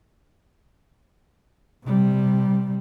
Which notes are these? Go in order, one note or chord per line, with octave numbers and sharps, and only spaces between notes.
C3 G3